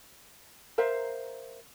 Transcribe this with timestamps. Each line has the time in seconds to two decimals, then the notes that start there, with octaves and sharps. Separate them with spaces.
0.78 A#4 C5 E5 F5